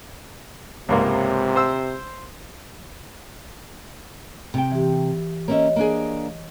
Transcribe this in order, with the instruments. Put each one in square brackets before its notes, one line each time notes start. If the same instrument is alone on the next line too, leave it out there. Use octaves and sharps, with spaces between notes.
[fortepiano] C#2 G#2 A#3 [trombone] C3
[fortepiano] C5 E6
[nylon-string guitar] C3 G5
[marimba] E3 G4
[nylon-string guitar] A#3 C#4 E5 [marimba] C#5 D#5
[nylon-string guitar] A#3 D4 G#4